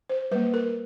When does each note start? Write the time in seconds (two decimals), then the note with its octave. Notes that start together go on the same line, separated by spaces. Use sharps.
0.09 C5
0.31 G3 A#3 B4
0.54 A#4